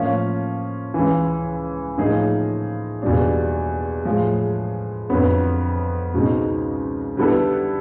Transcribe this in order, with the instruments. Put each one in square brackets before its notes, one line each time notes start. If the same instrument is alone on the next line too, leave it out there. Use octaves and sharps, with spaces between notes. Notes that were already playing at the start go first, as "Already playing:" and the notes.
Already playing: [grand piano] A2 F3 A#3 C#4
C#2 C#3 E3
A2 F3 A#3 D#4 G#4
E2 B2 G3 A#3 D4
A2 F3 G#3
F2 D3 F#3 B3
C#2 B2 G#3 C4 D#4
D3 G3 B3 E4 A4